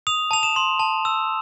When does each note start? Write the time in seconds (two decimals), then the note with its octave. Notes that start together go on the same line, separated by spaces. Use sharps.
0.07 D#6 F7
0.31 A5 F7
0.43 E7
0.56 C6
0.80 A5
1.05 E6